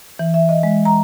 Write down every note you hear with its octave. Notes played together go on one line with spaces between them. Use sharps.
E3
E5
D#5
G#3
A#5